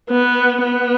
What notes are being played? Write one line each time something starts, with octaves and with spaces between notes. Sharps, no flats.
B3
B3